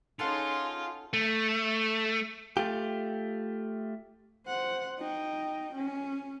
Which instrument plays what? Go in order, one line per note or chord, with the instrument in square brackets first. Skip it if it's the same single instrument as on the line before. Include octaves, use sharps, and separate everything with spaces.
[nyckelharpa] C#4 D#4 [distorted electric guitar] F4 [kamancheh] G#4 C6 [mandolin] A4 F#5 A5
[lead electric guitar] A3
[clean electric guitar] A3 F4 G4
[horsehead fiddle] C5 F#5
D#4 G5
C#4